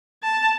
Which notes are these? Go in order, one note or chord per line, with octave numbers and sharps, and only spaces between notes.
A5